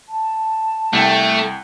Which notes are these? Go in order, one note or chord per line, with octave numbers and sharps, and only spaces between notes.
A5
C2 A3 G5